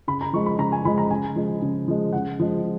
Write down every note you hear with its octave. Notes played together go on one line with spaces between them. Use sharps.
C#3 B5
A#5
F3 G#3 C#6
B5
C#3 A#5
G#5
F3 G#3 B5
A#5
C#3 G#5
F3 G#3
C#3
F3 G#3
C#3 F#5
F3 G#3